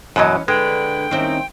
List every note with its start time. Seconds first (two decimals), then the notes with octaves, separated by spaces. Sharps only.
0.16 F#2 B2 E3 F#3 C#4 D#5
0.48 D3 G#3 B4 G5
1.11 D#3 A#3 C4 C#4 D#4 E4